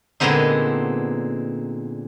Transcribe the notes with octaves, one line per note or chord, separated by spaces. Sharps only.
A#2 D3 G#3 B3 C4 D#4